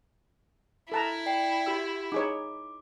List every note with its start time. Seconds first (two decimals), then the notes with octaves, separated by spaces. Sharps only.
0.92 E4 A4 A5 A#5
1.26 D5 G5 C7
1.66 F#4 G4 E6
2.12 D#4 G#4 C#5 D6